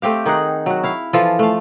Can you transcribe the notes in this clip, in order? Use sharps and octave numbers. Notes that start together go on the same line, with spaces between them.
A3 C4 G4 F5
D#3 D#4 G#4 F#5
F#3 F#4
E4 F5
E3 F3 F4 A4
A3 F5